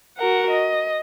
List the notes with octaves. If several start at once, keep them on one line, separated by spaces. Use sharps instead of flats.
F#4 A#4 F#5
D#5